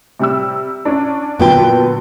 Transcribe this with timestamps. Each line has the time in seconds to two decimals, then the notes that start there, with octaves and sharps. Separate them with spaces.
0.19 C3 G3 E6
0.85 C#4 D4
1.40 A#2 D3 F#3 B3 B4 G5